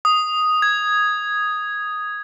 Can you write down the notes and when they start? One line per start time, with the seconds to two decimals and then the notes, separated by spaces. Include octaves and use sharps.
0.05 D#6
0.62 G#6